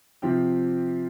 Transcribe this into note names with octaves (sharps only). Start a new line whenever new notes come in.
C3 F3 C4 G4